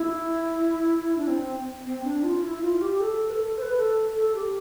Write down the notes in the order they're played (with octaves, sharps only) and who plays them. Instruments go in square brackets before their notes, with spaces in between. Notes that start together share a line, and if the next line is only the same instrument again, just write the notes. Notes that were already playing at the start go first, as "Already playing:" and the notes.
Already playing: [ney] E4
D4
C4
C4
D4
F4
E4
F4
G4
A4
B4
A4
C5
B4
A4
A4
G4